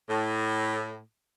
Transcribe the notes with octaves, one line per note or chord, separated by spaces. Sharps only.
A2